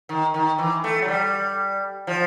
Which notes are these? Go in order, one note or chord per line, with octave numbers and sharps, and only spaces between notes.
D#3
D#3
E3
A3
F#3
G3
F3